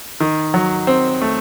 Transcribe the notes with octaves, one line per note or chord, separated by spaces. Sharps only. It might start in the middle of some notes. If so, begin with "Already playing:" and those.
D#3
F#3
C4
A3